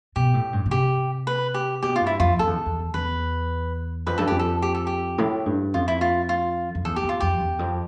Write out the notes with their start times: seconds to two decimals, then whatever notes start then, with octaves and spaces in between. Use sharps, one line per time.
0.16 B2 G4
0.34 A2
0.53 G2
0.66 B2
0.71 C3 G4
1.27 B4
1.54 G4
1.83 B2 G4
1.96 F4
2.01 G2
2.07 E4
2.20 F2 F4
2.39 F2 A4
2.47 E2
2.66 E2
2.94 E2 B4
4.07 F2 B4
4.18 G2 A4
4.28 F2 G4
4.39 A4
4.62 G4
4.75 A4
4.87 G4
5.18 A2
5.46 G2
5.74 F2 F4
5.88 E4
6.01 F4
6.29 F4
6.75 F2
6.84 E2 A4
6.96 G4
7.04 E2
7.09 F4
7.20 F2 G4
7.41 E2
7.59 F2